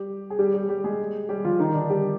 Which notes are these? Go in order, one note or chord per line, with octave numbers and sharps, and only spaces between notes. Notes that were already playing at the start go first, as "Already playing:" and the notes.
Already playing: G3 G4
G#4
G3 G4
G3 G4
G3 G4
G#3 G#4
G3 G4
F3 F4
D#3 D#4
D3 D4
G3 G4